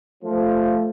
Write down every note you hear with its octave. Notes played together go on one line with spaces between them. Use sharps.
F3 A3